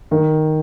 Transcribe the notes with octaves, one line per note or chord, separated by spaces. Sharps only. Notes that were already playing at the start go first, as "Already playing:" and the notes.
D#3